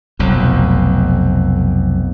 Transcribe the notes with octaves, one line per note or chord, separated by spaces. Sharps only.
F1 B1 F2